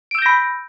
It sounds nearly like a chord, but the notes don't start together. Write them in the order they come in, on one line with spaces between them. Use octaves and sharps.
D7 E6 G6 A#6 B5